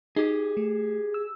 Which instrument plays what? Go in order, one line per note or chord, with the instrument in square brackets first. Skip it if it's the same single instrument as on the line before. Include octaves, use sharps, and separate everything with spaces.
[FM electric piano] D#4 [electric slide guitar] G4 G#4
[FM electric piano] A3
E6